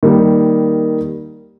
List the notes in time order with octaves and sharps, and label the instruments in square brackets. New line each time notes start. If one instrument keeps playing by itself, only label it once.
[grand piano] D#3 G3 A#3